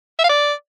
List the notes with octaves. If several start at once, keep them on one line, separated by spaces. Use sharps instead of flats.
E5
F5
D5